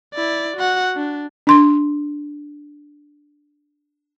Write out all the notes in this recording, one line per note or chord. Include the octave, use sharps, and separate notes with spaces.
E4 D5
F#4 F#5
D4
D4 C6